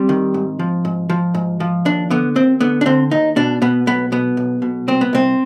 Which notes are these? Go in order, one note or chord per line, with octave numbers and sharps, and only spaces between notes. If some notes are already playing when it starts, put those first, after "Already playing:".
Already playing: G3 C4
D#3
G#2
F3
G#2
F3
G#2
F3
D#2 D4
D3 B3
D#2 C4
D3 B3
D4
D3 C4
D#2 D#4
B2 D4
B2 B3
B1 B3
B2 B3
B1
B2
C2 C4
B3
C2 C4